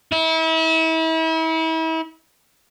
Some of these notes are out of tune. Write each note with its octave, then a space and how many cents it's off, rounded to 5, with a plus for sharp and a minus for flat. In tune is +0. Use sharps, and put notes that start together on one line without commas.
E4 -35